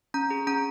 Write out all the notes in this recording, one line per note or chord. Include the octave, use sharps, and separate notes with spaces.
C#4 A#5
G#4
C#4 A#5